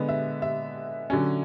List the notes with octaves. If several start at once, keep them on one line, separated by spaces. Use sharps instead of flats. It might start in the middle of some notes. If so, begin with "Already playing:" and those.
Already playing: D3 G#3 B3
E5
E5
D3 F#3 C#4